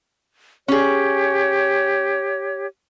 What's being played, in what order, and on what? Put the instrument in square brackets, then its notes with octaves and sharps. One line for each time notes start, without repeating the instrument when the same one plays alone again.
[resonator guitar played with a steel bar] C#4 G#4 [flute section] G4 C#5